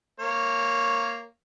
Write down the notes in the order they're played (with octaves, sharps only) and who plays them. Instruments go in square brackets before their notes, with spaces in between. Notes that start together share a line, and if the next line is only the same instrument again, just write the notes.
[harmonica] A#3 C#5